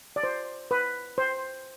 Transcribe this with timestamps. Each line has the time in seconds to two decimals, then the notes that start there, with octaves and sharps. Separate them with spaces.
0.16 D5
0.23 C5
0.71 B4
1.18 C5